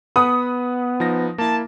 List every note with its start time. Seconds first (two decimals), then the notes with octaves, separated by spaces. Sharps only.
0.16 B3 B4 F#5 B5 D#6
1.00 F3 D#4 A#6
1.38 A#3 E4 A5